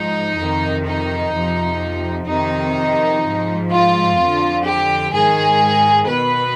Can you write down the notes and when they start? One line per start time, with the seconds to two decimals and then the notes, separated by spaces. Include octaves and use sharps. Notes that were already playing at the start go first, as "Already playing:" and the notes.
Already playing: G#2 F3 D#4
0.38 F2 C3 D#3
0.86 D#4
1.33 F2 C3 F3
2.28 F2 C3 D#3 D#4
3.23 G#2 F3
3.71 F4
4.18 F2 D3 F3
4.65 G4
5.13 G#2 D#3 G#4
6.08 B2 B4